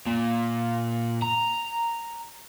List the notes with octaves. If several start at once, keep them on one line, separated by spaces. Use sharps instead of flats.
A#2
A#5